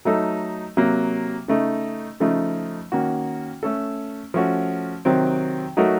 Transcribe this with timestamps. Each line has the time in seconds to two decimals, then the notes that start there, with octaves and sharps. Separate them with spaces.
0.05 F#3 A3 D#4 A4
0.77 C3 F#3 A#3
1.48 C#3 A3 D#4
2.20 C#3 F3 A3 D#4
2.92 D#3 A#3 C#4 F#4
3.63 A3 C#4 A4
4.34 F3 A3 C#4 F#4
5.05 C3 D#3 F#3 C4
5.77 F#3 A3 D#4 F#4 A#4